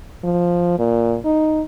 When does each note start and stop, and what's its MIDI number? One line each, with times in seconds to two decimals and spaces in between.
0.24 0.76 53
0.79 1.17 46
1.25 1.62 63